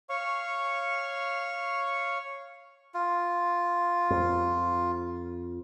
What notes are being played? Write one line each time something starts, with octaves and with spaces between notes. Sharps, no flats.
C#5 F5 C#6
F4
F2